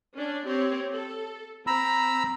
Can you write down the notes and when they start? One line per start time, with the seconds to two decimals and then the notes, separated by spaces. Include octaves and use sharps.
0.14 C#4 D4
0.47 C4 G4 C#5
0.92 A4
1.67 C4 A#5 B5 E6